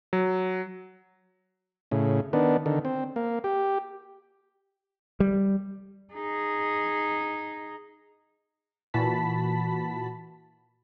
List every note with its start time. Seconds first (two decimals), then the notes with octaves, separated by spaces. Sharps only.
0.13 F#3
1.92 A2 C#3
2.33 D#3 B3 D4
2.66 D3 D#3
2.85 C4
3.16 A#3
3.44 G4
5.20 G3
6.14 D#4 G#4
8.94 A#2 E3 F#4 A5 B5 B6